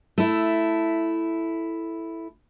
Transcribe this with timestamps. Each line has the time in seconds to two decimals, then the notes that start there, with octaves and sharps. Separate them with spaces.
0.18 A3 E4